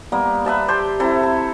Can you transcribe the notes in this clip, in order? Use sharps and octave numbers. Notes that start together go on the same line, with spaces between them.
G3 A#3 B3
B4 E5 A5 A#5
G4 G5 A5 C6
C4 E4 A4 A#5
A4